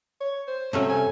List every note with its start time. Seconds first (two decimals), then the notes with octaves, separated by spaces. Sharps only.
0.21 C#5
0.48 C5
0.73 G2 C3 F#3 A3 C#4
0.89 G#5